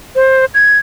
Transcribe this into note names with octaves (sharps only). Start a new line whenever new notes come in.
C5
G#6